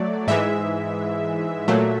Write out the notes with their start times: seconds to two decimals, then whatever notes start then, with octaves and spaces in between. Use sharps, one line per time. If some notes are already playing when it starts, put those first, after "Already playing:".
Already playing: F#3 A3 D5
0.28 G#2 E3 G#3 E5
1.68 A#2 F#3 A3